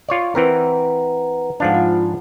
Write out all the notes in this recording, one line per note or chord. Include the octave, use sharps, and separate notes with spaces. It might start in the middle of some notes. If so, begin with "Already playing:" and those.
F4 C#5 D5
E3 C4 A#4 B4 F#5 A#5
G#2 F3 D4 F5 F#5
F4 B5